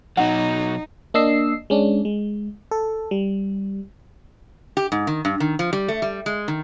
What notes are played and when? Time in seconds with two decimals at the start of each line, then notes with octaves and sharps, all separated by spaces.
0.17 B2 F#3 D#4 F#5
1.14 A#3 D4 D#5 E6 C7
1.70 G#3 C#4 D4
2.05 G#3
2.71 A4
3.11 G3
4.77 G4
4.92 G#2
5.07 D#3
5.25 G2
5.40 D#3
5.59 F3
5.73 G3
5.88 A3
6.02 G3
6.26 G#3
6.48 D#3